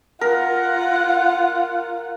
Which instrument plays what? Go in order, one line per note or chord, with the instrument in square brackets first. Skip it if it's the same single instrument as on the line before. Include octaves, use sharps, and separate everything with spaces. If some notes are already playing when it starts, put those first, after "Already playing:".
[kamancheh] F4 F#5 [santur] A#4